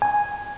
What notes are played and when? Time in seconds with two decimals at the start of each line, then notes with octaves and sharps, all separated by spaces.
0.02 G#5